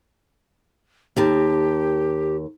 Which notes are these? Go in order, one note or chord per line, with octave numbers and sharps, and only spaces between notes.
D#2 G4 A#4 A5